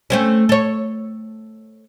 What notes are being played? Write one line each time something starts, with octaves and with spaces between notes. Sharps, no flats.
A3 C4 C#4
A4 C#5